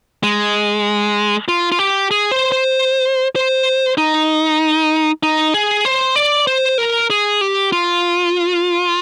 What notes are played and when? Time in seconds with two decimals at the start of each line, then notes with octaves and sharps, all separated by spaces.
0.23 G#3
1.48 F4
1.72 F4
1.79 G4
2.11 G#4
2.31 C5
2.52 C5
3.36 C5
3.98 D#4
5.23 D#4
5.54 G#4
5.85 C5
6.16 D5
6.47 C5
6.78 A#4
7.10 G#4
7.41 G4
7.72 F4